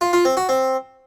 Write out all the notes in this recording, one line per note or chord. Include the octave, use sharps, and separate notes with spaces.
F4
F4
C4
F#4
C4